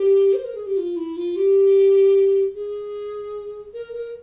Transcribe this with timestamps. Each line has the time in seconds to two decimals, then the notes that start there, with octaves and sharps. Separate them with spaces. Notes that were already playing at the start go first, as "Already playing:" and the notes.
Already playing: G4
0.33 C5
0.44 A#4
0.55 G#4
0.66 G4
0.77 F4
0.96 E4
1.16 F4
1.36 G4
2.55 G#4
3.74 A#4
3.93 A#4